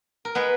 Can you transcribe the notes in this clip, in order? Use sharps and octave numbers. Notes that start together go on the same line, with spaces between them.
A#4
G#3 B3 B4